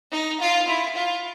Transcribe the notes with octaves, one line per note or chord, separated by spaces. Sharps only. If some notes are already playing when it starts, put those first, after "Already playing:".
D#4
F4
E4
F4